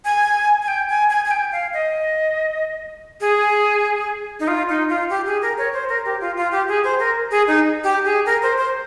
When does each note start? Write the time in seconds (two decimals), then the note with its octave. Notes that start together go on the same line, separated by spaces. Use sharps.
0.05 G#5
0.62 G#5
0.68 G5
0.89 G#5
1.10 G#5
1.25 G#5
1.31 G5
1.52 F5
1.73 D#5
3.21 G#4
4.40 D#4
4.48 F4
4.69 D#4
4.89 F4
5.10 G4
5.26 G#4
5.42 A#4
5.58 C#5
5.73 C5
5.89 A#4
6.05 G4
6.21 F4
6.37 F4
6.52 G4
6.68 G#4
6.84 C5
7.00 A#4
7.31 G#4
7.48 D#4
7.84 G4
8.05 G#4
8.26 A#4
8.42 C5
8.58 C5